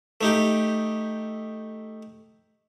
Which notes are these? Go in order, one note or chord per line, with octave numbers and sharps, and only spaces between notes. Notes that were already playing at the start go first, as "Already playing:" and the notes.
A3 D#4 G4